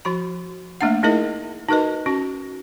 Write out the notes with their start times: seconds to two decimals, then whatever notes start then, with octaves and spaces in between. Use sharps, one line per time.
0.05 F3 F#4 B5
0.81 A3 A#3 D4 F#5
1.03 A3 D#4 E4 G#4 A#4 D#5
1.69 D#4 F#4 A#4 B4 D#5
2.06 C#4 F#4